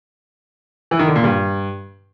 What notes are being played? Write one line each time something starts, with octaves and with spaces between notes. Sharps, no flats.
E3
D#3
D3
A#2
G2